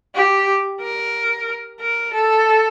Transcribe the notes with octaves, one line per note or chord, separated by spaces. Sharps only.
G4
A#4
A#4
A4